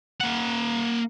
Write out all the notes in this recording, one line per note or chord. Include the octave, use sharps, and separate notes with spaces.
A#3 F#5